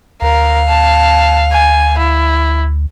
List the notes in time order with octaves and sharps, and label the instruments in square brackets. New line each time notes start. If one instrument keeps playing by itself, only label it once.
[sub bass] D2 [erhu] A#4 [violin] F5
[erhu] A5
G#5
E4